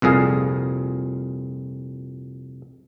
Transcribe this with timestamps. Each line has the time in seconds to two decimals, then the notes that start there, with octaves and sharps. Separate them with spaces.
0.02 C2 F2 A#2 G#4 F5